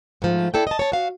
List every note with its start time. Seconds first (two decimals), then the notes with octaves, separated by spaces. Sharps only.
0.22 G#2 F3 A3
0.54 D4 E4 A4 D5 G5
0.67 D#5 A5
0.79 C#5 A5
0.92 F#4 F5